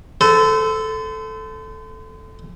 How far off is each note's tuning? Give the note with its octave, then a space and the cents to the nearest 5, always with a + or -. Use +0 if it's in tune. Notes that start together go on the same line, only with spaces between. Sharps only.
A4 -5 C5 -40